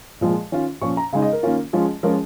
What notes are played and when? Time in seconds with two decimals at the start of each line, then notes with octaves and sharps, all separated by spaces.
0.21 A#2 F3 G#3
0.52 D#3 C#4 F4
0.81 A#2 F3 C#4 C#6
0.97 A#5
1.13 C#3 G#3 D#4 F5
1.22 D#5
1.32 A#4
1.43 D#3 A#3 C#4 F4
1.73 F3 G#3 C#4 F4
2.03 F3 G#3 C#4 F4 A#4